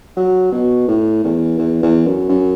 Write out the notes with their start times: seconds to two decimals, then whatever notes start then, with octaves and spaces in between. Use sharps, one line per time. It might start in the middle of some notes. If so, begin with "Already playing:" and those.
0.17 F#3
0.52 B2
0.88 A2
1.24 E2
1.58 E2
1.83 E2
2.07 F#2
2.29 F#2